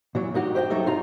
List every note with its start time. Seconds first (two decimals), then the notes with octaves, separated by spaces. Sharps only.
0.15 A#2 E3 F#3
0.34 G2 D#4 F#4 G4
0.55 G4 C5 D#5 G5
0.70 G2 F#3 D#4 A4 E5
0.86 D#4 F4 A#5